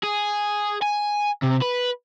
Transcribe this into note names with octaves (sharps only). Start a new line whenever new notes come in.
G#4
G#5
C3
B4